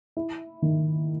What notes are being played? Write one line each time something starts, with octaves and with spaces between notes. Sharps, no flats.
E4
D#3